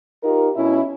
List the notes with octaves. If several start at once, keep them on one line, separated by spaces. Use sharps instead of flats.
D#4 F4 G4 A#4
B2 C#4 E4